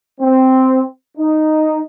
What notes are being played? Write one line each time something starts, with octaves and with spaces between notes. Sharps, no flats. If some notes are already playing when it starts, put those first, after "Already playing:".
C4
D#4